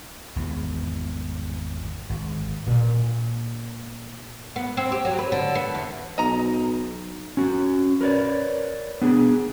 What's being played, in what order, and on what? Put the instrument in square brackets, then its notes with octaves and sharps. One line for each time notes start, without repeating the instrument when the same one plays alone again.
[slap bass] G#1 E2 E3
G#1
[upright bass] A#2 D3
[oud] B3
C4
G4
F#3
B4
D3
B3
E2
[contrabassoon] B1 [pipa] D#5 A#5
[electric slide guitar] C#4 F#4
A#4 B4 C#5 D5
B3 D4 G#4